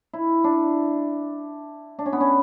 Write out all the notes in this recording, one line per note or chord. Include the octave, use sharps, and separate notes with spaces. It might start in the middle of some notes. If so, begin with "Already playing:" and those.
E4
D4
D4
C#4
B3
C#4